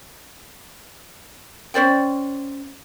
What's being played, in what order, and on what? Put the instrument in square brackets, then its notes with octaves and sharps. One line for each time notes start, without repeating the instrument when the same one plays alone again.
[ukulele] C#4 C5 D5 G5